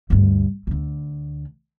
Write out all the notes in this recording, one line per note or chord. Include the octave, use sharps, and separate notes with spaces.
D2 G2
D2 D3